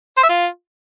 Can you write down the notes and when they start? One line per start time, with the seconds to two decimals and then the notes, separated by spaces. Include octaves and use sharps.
0.17 C5
0.23 E5
0.29 F4